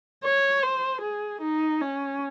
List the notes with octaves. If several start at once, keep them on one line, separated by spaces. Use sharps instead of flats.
C#5
C5
G#4
D#4
C#4